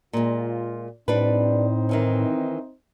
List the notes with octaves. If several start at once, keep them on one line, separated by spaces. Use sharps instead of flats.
A#2 G#3 F4
A2 G3 C4 D4 D#4 B4 C5
D#3 E3 C#4